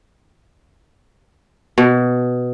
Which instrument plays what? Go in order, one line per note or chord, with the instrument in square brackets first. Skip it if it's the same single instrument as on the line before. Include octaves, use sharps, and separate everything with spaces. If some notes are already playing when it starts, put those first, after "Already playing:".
[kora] B2